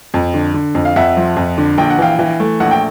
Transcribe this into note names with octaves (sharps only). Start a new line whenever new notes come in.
F2
D3
D3
F2
F5
F2 E5 F#5
F3
F2
D3
A#1 G5
F#5
E3 F5 G5
E3
A3
A#1 F#5
G5